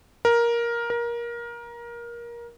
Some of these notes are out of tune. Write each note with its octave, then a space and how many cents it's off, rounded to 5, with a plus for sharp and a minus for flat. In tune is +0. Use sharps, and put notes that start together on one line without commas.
A#4 +10
A#4 +20